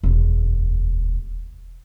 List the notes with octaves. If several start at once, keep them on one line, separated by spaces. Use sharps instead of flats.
E1 D2